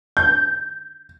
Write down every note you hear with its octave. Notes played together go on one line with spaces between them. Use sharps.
G6